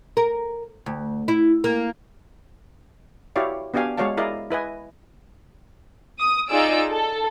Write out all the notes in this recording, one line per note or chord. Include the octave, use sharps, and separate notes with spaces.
A#4
D2
E4
A#3
E4 F#4 G4 C#5 D5 F5
B3 D4 F#4 G4 F5 G#5
G#3 F#4 C#5 D5 F5 A5
E4 G#4 A#4 D5 D#5 F5
E4 B4 D#5 G#5
D#6
D#4 F4 G#4 D5 E6 D7
A4